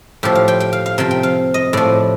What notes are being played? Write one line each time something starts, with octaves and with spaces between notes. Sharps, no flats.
A2 F3 G4
F5
G5
G5
F5
F5
C3 F3 G5
G5
F5
D#5
A2 F3 D5